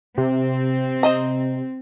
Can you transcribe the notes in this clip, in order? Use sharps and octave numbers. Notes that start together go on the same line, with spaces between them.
C3 C4
C5 D#5 A#5